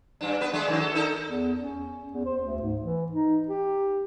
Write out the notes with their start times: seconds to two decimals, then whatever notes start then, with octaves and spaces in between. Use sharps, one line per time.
0.21 G2 D4
0.41 B3 B4
0.53 G#3 A3 D4
0.68 D#3 F#3
0.81 A4
0.95 D#4 A4 A#4
1.25 E2
1.60 C#4
2.13 E2
2.26 C5
2.43 D2
2.62 G#2
2.81 E3
3.12 D#4
3.48 G4